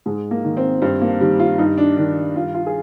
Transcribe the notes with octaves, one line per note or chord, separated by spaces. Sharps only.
G#2 G#3
A#3
D#3
C4
G2 C4
A#3
D#3 G3
F4
G2 D#4
D4
D#3 D4
G2 F4
F4
G#4